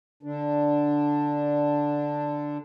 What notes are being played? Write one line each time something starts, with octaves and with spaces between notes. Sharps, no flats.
D3 D4